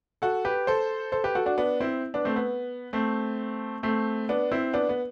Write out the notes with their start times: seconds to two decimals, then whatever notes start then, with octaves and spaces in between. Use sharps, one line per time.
0.22 F#4 A4
0.45 G4 B4
0.67 A4 C5
1.12 A4 C5
1.24 G4 B4
1.35 F#4 A4
1.46 D4 F#4
1.58 B3 D4
1.80 C4 E4
2.14 B3 D4
2.25 A3 C4
2.36 B3
2.93 A3 C4
3.83 A3 C4
4.29 B3 D4
4.52 C4 E4
4.73 B3 D4
4.89 B3